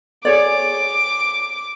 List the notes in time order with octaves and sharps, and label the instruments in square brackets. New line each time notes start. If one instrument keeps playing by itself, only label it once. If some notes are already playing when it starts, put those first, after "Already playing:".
[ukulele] G#4 C#5 D5 [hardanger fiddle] D6